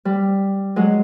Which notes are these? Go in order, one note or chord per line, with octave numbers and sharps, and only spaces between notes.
G3
F#3 G#3